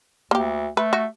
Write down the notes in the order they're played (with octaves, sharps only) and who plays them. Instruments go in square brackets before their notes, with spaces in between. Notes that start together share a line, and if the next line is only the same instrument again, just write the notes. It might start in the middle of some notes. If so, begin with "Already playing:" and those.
[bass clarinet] D2 [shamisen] A#3 G4
[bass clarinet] A3 [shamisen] B4
[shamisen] F#4